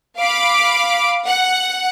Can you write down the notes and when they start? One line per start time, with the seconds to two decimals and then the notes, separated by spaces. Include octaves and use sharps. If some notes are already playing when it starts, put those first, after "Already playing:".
0.19 F5 B5 D6
1.26 F#5